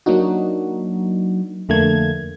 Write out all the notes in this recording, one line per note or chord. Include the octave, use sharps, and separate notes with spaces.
F#3 A#3 D4 D#4 F#4
F2 D3 A3 A#3 G#6